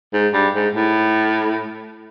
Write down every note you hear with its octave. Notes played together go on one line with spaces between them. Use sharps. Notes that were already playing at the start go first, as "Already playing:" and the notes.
G#2
G2
G#2
A2